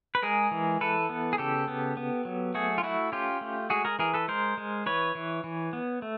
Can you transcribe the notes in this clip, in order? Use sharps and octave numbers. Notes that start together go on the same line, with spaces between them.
B4
G#3 G#4 A#4
E3
E3 A4 B4
B3
G#4
C#3 G4 A4
B3
B3
F#3
A3 F#4 G#4
F4
A3 E4 F#4
C#4 F4 G4
A3
G#3 F#4 G#4
G#4 A#4
E3 G#4 A#4
A4 B4
G#3 A#4 C5
G#3
E3 B4 C#5
E3
E3
B3
A3